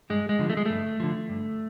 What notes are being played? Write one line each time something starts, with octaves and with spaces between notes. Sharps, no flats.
G2 G#3
G#3
D3 F3
A3
G#3
G2 A3
D3 F3
G2